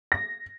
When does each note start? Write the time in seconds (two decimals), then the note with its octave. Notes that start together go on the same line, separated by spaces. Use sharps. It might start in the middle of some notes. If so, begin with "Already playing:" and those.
0.12 A#6